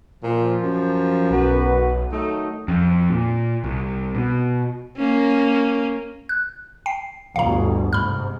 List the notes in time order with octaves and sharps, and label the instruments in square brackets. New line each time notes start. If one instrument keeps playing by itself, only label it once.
[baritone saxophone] A#2 [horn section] F3
[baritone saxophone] F#2
[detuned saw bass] B1 [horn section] F#4 B4
[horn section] D#3 F#3 D#4 [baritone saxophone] A3
[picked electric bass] F2
A#2
C2
B2
[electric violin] A#3 C#4
[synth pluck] F#6
G5 C7
[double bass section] G1 D2 B2 [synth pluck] F5 A#5
[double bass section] G#2 C3 [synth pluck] B5 F6